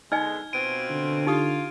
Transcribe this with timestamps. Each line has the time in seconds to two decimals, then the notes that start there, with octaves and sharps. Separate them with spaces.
0.12 D3 G#3 B3 D#4 D#5 G#5 F6 G#6
0.53 B2 C4 F4 D7 D#7
0.90 D3
1.27 D#4 F4 G4 D#6